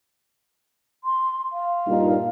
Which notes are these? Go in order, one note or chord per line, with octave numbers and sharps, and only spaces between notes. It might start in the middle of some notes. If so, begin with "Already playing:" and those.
C6
F5
G2 A#2 D#4